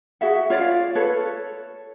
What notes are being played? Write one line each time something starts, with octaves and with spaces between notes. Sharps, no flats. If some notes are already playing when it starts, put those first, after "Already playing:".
F#4 G#4 E5 F#5
F4 C#5 D5 F5
A4 B4 C#5